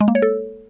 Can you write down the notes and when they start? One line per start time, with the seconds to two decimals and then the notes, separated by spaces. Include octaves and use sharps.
0.01 G#3
0.08 A#3
0.15 C#5
0.22 A4